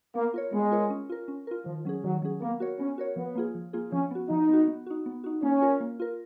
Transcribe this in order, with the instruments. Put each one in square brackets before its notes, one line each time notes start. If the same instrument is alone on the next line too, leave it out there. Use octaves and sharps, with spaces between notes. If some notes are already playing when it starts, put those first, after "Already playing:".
[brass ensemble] A#3 [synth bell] B3
[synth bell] F4 A#4 C#5
[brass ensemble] G#3 [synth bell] B3
[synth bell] F4 A#4 C#5
C#4
F4 A#4
C#4
F4 A#4
[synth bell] D#3 [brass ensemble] F3
[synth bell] F#3 C#4 G#4
[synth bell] D#3 [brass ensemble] F#3
[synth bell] F#3 C#4 G#4
[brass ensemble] A#3 [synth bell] B3
[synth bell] F#4 A#4 C#5
[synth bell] B3 [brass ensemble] C#4
[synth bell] F#4 A#4 C#5
[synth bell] F3 [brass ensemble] B3
[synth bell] A#3 F4 G#4
F3
A#3 F4 G#4
[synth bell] F3 [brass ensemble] C#4
[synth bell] B3 F#4
[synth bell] F3 [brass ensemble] D#4
[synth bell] B3 F#4
B3
D#4 F#4
B3
D#4 F#4
[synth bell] A#3 [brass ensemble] C#4
[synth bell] F4 A#4
A#3
F4 A#4